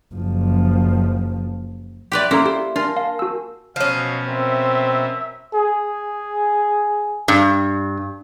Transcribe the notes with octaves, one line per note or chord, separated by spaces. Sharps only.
F#1 F3
G4 B4 D5 E5 C6
A#3 C#4 E4 A4 C5 A#5
G4 C5
D4 F4 A#4 G#5 A5
F5
F#4 E6
B2 F3 F#3 C#4 D#5 F5
C4 A#4 E5
G#4
G2